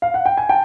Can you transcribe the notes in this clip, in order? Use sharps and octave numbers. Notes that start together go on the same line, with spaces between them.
F5
F#5
G5
G#5
G5 A5